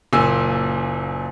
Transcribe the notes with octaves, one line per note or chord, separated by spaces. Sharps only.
F#1 A#2 G#5 E6